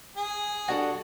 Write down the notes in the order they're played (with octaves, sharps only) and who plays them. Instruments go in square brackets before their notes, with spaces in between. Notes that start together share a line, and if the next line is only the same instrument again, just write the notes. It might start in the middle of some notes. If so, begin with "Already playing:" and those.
[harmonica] G#4
[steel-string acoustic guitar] G3 D4 A4 [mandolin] F#4